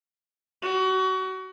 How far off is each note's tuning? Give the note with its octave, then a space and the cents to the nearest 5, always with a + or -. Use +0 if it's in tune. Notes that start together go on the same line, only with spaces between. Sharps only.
F#4 +30